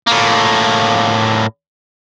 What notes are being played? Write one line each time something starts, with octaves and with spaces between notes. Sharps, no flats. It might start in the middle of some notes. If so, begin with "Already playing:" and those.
A2 A#3